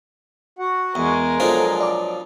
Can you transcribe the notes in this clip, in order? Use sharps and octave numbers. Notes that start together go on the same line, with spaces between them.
F#4 F#5
E2 G#3 A#4
B2 F3 F#3 D4 D#4 F4 A4 C5
D5 D6